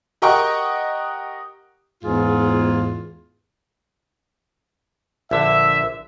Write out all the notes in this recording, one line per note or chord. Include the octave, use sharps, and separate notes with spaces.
G4 A#4 D#5 F#5 G5 C#6
E2 G#2 F4 G#4
A#1 D3 E5